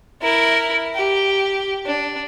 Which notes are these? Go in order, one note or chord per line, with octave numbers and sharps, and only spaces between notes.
E4 A#4
G4
D4